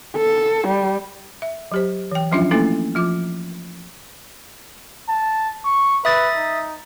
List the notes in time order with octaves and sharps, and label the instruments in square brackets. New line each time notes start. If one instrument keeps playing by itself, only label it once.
[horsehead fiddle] A4
G3
[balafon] E5
F#3 G4 C5
E3 G5
F3 F#3 C#4 D4 F4 E5
A3 A#3 C#4 E4 A4
F3 F4 D6
[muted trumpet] A5
C#6
[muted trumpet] B4 [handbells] E5 D#6 A6
[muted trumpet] D#4